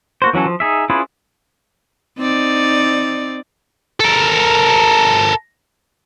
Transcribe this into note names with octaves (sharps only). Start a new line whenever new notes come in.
A#3 F#4 C5
E3 F#3 C#4 A4
F3
D#4 G#4 E5
C#4 E4 F4 G#4 B4
C4 D#4 D5
A4 A#4